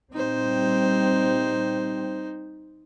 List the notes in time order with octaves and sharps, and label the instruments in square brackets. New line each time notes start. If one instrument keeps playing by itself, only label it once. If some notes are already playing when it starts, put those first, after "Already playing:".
[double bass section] A#2 G3 C4 [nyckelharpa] D#4 C5